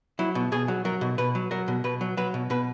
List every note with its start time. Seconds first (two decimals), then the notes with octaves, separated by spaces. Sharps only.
0.19 F#3 E4
0.35 B2
0.52 B2 G#4
0.68 F#3
0.85 F#3 A#4
1.01 B2
1.18 B2 B4
1.35 F#3
1.51 F#3 A#4
1.68 B2
1.84 B2 B4
2.01 F#3
2.17 F#3 B4
2.34 B2
2.50 B2 B4